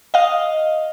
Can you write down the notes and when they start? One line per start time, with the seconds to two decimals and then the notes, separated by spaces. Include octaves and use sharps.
0.14 D#5 F5